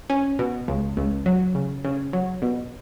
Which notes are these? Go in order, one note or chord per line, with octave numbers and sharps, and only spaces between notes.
C#4
B2
C#2
C#2
F#3
C#3
C#3
F#3
B2